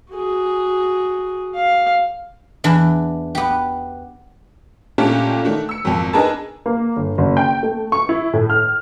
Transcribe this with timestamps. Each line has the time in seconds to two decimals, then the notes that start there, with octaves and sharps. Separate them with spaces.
0.12 F#4 G#4
1.55 F5
2.64 E2 E3 D4
3.35 B3 G4
4.98 A#2 A3 C#4 D4 G4
5.45 D#3 A3 D4
5.69 E6 C#7
5.85 G#1 F2
6.13 D4 D#4 G#4 A#4 B4 A5
6.66 A#3
6.96 G1
7.18 F#1
7.37 G5
7.63 A3
7.92 C#6
8.09 E4
8.34 A2
8.50 F6